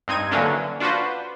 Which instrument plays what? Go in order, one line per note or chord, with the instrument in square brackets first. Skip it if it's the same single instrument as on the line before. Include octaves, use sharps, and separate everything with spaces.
[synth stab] G2 C4 D#4 G#6 D#7
D3 E3 F#3 A#3 C#4 D4
D4 F4 F#4 B4 C5